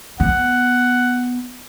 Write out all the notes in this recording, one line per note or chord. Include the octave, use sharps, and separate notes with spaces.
B3 F#5